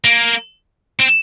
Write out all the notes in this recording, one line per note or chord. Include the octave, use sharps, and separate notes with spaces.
A#3
C4